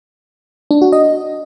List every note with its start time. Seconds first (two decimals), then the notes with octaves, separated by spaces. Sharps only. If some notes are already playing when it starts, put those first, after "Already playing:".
0.71 D4
0.82 F#4
0.92 D#5